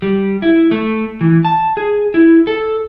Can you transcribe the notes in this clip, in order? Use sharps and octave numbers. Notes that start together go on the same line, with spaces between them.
G3
E4
A3
E3
A5
G#4
E4
A4